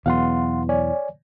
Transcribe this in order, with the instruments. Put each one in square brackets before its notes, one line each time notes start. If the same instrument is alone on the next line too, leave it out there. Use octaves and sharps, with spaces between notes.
[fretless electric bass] E2 B2 F#3 [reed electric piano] F5 F#5 C6
[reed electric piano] C#5 D5 G#5